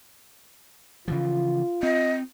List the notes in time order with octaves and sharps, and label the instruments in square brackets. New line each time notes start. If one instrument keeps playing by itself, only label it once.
[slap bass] C#3 E3 F3 [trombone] F4
[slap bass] C4 [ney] D#5